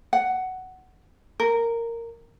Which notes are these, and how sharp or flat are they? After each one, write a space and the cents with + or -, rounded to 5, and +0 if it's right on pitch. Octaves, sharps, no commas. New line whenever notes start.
F#5 +10
A#4 -10